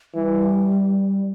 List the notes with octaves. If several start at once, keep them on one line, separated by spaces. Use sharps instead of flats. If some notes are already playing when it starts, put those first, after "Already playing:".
E3 G3